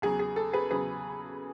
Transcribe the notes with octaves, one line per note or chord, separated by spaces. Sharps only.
E2 C#3 F#3 G#4
G#4
A4
G#4 B4
E2 C#3 F#3 G#4 B4